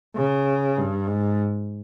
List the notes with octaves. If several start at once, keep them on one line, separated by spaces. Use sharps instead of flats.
C#3
G2
G#2